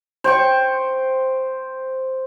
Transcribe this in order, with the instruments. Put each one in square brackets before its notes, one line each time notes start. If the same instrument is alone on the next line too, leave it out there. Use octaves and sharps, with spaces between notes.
[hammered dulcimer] C5 G5 C#6